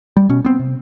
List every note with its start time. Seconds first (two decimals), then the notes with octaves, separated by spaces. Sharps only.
0.17 G3
0.29 B2 C#4
0.45 B3 C4
0.59 C3